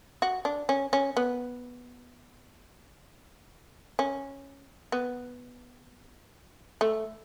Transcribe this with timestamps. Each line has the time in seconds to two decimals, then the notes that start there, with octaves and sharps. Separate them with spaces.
0.22 F#4
0.45 D4
0.69 C#4
0.93 C#4
1.17 B3
3.99 C#4
4.92 B3
6.81 A3